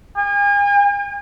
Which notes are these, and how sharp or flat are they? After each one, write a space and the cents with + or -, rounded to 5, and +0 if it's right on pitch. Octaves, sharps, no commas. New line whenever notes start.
G#5 -40